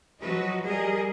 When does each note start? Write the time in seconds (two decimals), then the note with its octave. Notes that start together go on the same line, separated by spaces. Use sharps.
0.20 F3 F#3 F#4 B4 D#5
0.63 G3 G#4 A#4 D#5